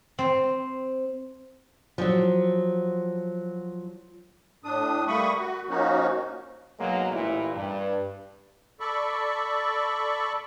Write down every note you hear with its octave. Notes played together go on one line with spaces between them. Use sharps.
C4
F3 F#3
A2 D4 D#6
G3 A3 A#3 B5 C#6 D#6
F#4
F3 A#3 C#4 D#4 F#4
B1 F#3 G#3 A#3
A1 A#2 E4
G2
A4 D5 B5 C#6